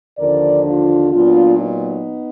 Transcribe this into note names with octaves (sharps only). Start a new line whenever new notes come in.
D#2 D3 F3 A#4 D5
D4 F4
A#2 F#3 B3 D4 F4
B3 D#4